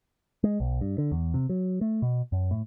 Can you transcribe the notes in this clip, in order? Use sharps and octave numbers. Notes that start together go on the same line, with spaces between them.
G#3
B1
G2
D3
E2
C3
F#3
A3
B2
F#2
A2